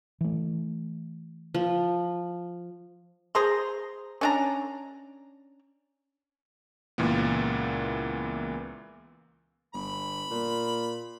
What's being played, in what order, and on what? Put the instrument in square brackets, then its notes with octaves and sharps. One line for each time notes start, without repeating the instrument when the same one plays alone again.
[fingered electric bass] E3 A3
[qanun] F3
[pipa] G#4 C5 A#5 C6
C#4 D4 A#5
[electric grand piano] C#2 A#2 E3 A#3 B3
[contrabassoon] G1 [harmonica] B5
[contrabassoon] A#2